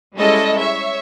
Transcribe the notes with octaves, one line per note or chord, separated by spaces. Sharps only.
G3 G#3 C#4 E4 A4 D#5
C#5 E5